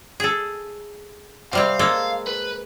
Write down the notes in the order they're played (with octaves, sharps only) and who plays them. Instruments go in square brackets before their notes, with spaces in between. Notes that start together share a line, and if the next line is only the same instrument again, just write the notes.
[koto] G#4 A4
[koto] C3 G3 C4 [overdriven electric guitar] F5
[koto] G#3 A#3 A4
[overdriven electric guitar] B4